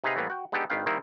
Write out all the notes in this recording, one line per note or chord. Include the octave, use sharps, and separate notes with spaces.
C3 D#4 G#4 B4 D#5 F5
A2 E3 G3 A#3 B3
F#4 G5
G#3 B3 D4 D#4 G4 A4
G#1 D#3 D4 B4 F5 G5
D#3 G3 A#3 C4 D#4 E4